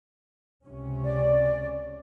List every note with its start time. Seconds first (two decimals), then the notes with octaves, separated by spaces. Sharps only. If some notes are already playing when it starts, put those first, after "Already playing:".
0.64 C#2 C3 C#4
1.04 D5